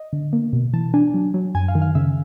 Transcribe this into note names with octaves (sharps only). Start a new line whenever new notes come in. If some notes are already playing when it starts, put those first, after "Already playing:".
Already playing: D#5
D3
A#3
B2
E3 A5
D4 G#5
F#3
F#3
F#2 G#5
F5
D#3
F5
C#3 E5